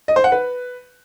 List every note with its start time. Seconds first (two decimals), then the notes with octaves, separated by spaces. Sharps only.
0.08 D#5
0.16 C5
0.24 F#5
0.32 B4